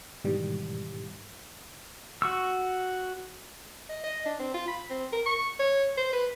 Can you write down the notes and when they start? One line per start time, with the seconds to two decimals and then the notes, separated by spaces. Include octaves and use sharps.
0.24 G#2 B2 D#3 E3 G3
2.22 F#4 C#6 E6
3.89 D#5
4.04 D#5
4.26 D4
4.40 C4
4.54 F4
4.68 B5
4.90 C4
5.13 A#4
5.26 C#6
5.59 C#5
5.98 C5
6.13 B4